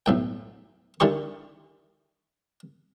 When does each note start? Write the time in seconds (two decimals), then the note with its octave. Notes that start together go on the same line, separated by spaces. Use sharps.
0.06 B1 A2 G5
1.00 D3 D#3 E4 G4 C#6